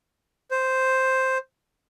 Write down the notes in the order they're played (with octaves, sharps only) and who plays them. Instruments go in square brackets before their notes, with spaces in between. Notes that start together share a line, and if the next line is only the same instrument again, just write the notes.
[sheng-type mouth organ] C5